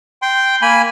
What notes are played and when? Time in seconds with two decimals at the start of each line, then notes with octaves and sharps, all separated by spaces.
0.22 G5 C6
0.62 A#3 G#5 B5